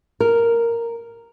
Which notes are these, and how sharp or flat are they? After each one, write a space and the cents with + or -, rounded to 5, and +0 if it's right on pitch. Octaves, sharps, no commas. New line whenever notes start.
A#4 -5